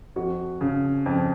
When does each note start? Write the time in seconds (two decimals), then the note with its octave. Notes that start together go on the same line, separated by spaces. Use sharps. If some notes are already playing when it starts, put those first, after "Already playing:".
0.16 F2 F#4
0.61 C#3
1.06 F2